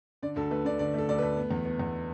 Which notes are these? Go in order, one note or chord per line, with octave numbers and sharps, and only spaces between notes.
D3 D5
D2 A4
A3 B4
D3 D5
D3 D5
A3 A4
D2 D5
A3 B4
B3
E2
B3
E2